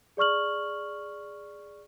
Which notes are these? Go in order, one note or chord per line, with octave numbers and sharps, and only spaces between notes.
G#4 D5 C#6 F6 F#7